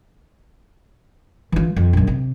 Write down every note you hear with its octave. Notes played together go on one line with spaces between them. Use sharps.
E3 F4
F2
A#1 F#2
C3